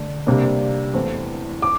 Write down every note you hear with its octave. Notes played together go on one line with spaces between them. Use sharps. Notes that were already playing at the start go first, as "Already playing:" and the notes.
Already playing: D3 A3 D4
C3 G3 A#3 D4
E2 E3 A3 C4
D6